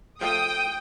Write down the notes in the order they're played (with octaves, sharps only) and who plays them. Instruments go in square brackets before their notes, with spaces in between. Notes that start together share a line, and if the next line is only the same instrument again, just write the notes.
[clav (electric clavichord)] F3 A3 F4 [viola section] G5 [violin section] D#6